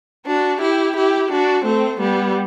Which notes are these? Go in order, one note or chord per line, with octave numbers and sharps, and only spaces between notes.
D4 F#4
E4 G4
E4 G4
D4 F#4
A3 C4
G3 B3